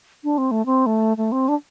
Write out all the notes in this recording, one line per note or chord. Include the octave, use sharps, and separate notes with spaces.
D4
C4
A3
C4
A3
A3
C4
D4